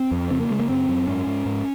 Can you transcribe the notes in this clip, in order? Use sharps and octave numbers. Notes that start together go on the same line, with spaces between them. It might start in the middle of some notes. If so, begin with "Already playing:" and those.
Already playing: C4
F2
C#3 C4
A#3
C#3 G#3
A#3
F#2 C4
F#2
G#2 C#4
G#2
G#2